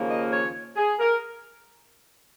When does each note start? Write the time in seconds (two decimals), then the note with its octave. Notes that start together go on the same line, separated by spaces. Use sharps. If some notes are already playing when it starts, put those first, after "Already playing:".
Already playing: D#2 C#3 F3 A#3
0.09 D#5
0.32 C#5
0.76 G#4
0.99 A#4